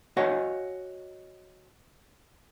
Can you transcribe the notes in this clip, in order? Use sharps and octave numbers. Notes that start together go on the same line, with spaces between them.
F#4 C#5 D#5 F5 F#5 G#5